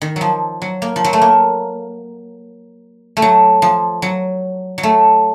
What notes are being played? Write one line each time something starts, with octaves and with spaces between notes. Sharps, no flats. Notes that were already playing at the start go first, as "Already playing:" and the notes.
D#3
F3 F#3
F#3
A#3
F3
F#3
A3
A#3
A3
F#3
F3
F#3
F#3
A3